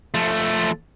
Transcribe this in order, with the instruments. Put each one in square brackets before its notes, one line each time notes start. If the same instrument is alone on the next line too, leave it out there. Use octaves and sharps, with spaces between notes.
[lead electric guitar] F3 A3